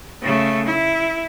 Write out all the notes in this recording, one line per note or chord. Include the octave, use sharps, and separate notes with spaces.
C#3 A3
E4